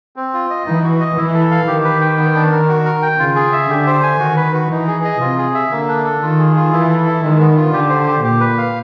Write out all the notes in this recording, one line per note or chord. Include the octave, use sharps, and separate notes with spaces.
C4
F4
D#5
E3 D#4
F#4
D#5
E3 E4
A4
F5
D#3 G4
B4
G5
B3
D4
A#4
F#4
A#4
G5
C#3 F4
G#4
E5
D3 G4
C5
G#5
D#3 F#4
B4
F#4
E3 D#4
G#4
D#5
C3 F4
G#4
E5
D3 A#3
D4
A4
D#3 F4
G#4
F4
E3 E4
A4
E4
D#3 G#3
B3
F4
D3 G4
C5
G4
A#2 G4
B4
F5